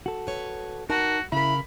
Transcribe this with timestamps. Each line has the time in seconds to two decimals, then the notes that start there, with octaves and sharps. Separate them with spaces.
0.06 F#4 A4
0.27 B4 C#5
0.90 D#4 F#4 A#4 A5
1.32 C#3 E4 A#4 B5